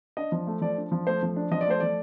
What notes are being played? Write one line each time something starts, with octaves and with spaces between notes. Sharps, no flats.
D4 D#5
F3
A3
F3 D5
D4
F3
A3 C5
F3
D4
F3 D#5
D5
A3 C5
F3 D5